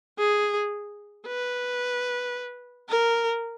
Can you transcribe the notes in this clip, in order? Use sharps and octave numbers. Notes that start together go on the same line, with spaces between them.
G#4
B4
A#4